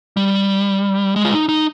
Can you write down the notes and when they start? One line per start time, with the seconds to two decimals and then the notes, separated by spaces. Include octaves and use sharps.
0.17 G3
1.16 G#3
1.25 F4
1.32 D#4
1.49 D#4